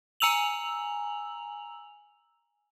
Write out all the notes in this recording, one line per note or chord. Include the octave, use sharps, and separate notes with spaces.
G#5 A#5 E6 F7 F#7